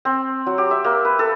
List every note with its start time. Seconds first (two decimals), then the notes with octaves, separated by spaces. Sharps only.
0.05 C4
0.47 F#3
0.58 G4
0.71 E5
0.84 A#3
1.05 B4
1.19 A4